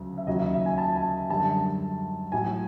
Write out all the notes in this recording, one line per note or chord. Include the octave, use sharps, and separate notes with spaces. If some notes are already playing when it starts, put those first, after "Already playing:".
Already playing: D2 C#3 F#3
E5
D#2 C#3 F#3 D#5
E5
E5
G#5
A5
A5
F#2 D3 G3 A5
A2 F#3 G#5